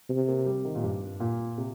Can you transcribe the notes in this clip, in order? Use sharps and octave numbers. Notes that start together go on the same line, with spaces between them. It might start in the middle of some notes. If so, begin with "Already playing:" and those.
C3
A#3
G3
D#3
A#2
G2
A#2
C3